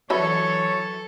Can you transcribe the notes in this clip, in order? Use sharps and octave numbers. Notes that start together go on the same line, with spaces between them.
E3 F#3 F#4 A4 B4 C#5 E5